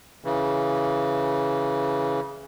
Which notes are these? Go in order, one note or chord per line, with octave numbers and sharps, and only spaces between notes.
C#3 E3